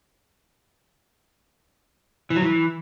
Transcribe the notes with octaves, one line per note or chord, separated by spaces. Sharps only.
E3
F#3
E3